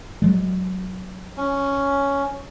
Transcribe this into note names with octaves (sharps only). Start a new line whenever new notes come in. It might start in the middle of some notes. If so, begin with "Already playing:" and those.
F#3 G#3
C#4